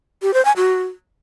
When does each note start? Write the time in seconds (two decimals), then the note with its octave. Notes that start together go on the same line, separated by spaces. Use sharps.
0.22 G4
0.34 C5
0.45 G#5
0.56 F#4